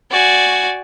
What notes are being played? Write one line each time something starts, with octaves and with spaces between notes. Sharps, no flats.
F#4 D5 G#5